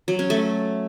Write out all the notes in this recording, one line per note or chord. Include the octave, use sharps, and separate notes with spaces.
F#3
C#4
A3